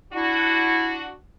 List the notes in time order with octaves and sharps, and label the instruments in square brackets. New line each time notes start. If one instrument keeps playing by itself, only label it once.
[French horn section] D4 F#4 [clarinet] E4